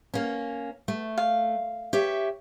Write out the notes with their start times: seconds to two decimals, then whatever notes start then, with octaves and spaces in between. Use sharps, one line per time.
0.14 A#3 C#4
0.88 A3
1.18 F5
1.93 G4 C#5 E5